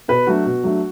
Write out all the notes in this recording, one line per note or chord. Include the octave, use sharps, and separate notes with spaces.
B2 B4
F#3 A3 D4 F#4
B2
F#3 A3 D4